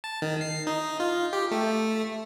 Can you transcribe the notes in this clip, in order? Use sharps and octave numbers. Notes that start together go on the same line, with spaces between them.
A5
D#3
C7
D#4
F4
G4
A3